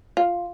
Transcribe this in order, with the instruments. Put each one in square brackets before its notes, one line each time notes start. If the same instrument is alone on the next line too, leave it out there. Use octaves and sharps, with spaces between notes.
[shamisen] F4